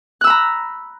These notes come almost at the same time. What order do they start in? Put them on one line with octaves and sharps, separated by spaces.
F#6 E6 B5 A#5